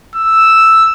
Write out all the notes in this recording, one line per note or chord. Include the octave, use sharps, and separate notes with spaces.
E6